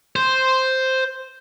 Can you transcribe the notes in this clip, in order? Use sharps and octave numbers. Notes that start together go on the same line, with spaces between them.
C5